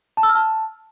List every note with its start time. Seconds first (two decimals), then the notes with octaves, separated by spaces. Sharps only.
0.17 A5
0.23 E6
0.29 F6
0.35 A5